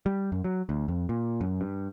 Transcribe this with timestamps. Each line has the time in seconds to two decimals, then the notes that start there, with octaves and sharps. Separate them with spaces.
0.06 G3
0.32 F#2
0.44 F#3
0.69 D2
0.88 F2
1.09 A#2
1.41 F#2
1.61 G2